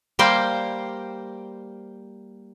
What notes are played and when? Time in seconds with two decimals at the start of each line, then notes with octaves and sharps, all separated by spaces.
0.19 G3 A#3 C5 G5